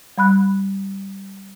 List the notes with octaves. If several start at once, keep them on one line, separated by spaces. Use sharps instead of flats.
G3 B5 F#6